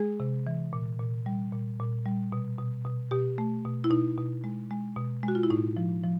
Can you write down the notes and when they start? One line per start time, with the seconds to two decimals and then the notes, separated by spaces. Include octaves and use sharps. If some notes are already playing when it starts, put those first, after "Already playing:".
Already playing: G#3 G#4
0.20 C3
0.47 E3
0.73 A#2
1.00 A#2
1.26 G3
1.53 A#2
1.79 A#2
2.06 G3
2.32 B2
2.58 B2
2.85 B2
3.11 B2 G4
3.38 A3
3.65 B2
3.84 E4
3.90 B2 D#4
4.17 B2
4.44 G#3
4.71 G#3
4.97 B2
5.23 G#3 F#4
5.35 F4
5.43 E4
5.50 A2 D#4
5.77 F3
6.03 F3